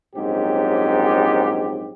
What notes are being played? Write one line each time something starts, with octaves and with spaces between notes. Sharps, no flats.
A#1 G#2 F#3 C4 C#4 G4